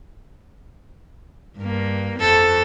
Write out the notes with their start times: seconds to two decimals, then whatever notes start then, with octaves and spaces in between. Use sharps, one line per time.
1.58 G2 A#3
2.19 F2 C4 A4